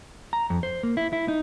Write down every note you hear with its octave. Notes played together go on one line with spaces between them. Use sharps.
A#5
F2
C5
A#3
E4
E4
D#4